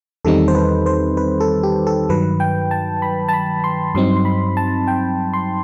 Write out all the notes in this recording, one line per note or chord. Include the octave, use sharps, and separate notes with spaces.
E2 D#3 G3 C4 D#4 A4
C5
B4
C5
B4
A4
G4
A4
G2 D#3 F#3 B4
G5
A5
B5
A5
B5
C6
G2 F#3 C4 D#4 C6
C6
B5
A5
G5
C6